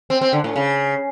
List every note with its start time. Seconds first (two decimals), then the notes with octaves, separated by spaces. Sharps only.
0.10 C4
0.21 C4
0.33 D3
0.44 A2
0.56 C#3